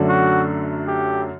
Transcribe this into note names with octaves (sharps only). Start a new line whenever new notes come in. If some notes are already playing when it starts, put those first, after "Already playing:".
Already playing: F#2 D3 F#3 A3 D4
F#4
G4